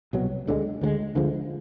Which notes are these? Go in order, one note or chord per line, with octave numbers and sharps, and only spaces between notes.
C2 B2 F#3
D2 D3 F3 G#3
D2 D3 F3 G#3
D2 D3 F3 G#3